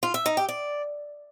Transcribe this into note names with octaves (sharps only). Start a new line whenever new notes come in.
F4
E5
D#4
G4
D5